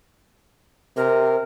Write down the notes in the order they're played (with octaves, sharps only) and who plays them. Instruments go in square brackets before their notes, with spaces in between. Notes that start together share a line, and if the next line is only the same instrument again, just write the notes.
[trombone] C3 [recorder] A#4